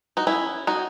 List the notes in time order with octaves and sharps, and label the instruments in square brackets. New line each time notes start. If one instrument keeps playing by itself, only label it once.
[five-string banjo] D#4 F#4
C#4 E4
D#4 F#4